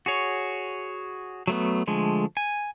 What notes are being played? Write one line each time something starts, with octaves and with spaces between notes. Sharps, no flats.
F#4 G#4 C#5
F#3 A3 B3
D3 F3 G#3 A3
G#5